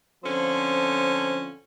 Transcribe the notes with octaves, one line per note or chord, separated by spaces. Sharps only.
D3 F3 C4 C#4